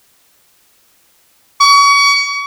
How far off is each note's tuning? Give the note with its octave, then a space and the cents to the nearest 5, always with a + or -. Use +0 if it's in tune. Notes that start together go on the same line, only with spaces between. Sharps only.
C#6 +35